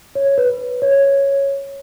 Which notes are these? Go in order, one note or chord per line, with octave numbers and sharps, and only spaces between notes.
C#5
B4
C#5